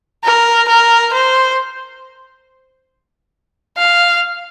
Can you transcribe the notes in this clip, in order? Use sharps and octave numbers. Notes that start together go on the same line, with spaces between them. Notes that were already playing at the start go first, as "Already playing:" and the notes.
A#4
A#4
C5
F5